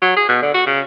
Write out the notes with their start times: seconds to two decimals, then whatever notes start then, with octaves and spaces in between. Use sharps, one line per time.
0.02 F#3
0.16 G#4
0.29 B2
0.42 D3
0.54 F#4
0.66 C#3